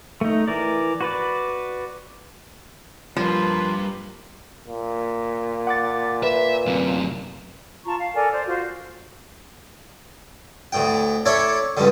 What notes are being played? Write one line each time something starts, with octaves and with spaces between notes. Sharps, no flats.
A3 D#4
E3 A#4 D5
F#4 B4 D5
G2 F3 G3 A#3 B4
A#2
F#5 D6 A6
B4 E5
F#2 C3
F4 A5 A#5 C#6
F5
A4 A#4 D5 G#5
C5 D5
F4 F#4 C5
D2 A2 G5
E4 A4 C#5 D5
C#2 G2 D3